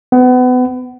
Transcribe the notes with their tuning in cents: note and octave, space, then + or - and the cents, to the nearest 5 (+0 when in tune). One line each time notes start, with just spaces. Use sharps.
B3 +30